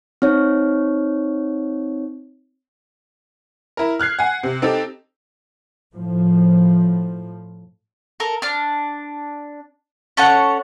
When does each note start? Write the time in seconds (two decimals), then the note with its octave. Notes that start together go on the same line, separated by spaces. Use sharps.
0.22 C4 D#4 C#5
3.77 E4 A#4
4.00 F6 F#6 G#6 C7
4.19 F#5 G#5
4.43 C3
4.62 C4 D#4 G4 A4
5.97 A2 F3
8.20 A4 A#4
8.42 D4 F6
10.17 C#4 A4 C#5 F#5